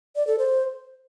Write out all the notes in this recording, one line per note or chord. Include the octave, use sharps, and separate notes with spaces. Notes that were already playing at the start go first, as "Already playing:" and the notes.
D5
A4
C5